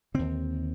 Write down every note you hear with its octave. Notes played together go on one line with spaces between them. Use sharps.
D#2 D3 C4